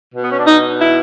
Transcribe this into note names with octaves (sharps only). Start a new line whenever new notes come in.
B2
B3
C#4
D4
D#4
E4